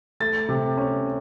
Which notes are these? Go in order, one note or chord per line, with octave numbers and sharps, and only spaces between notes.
A3 A6
C3
C#4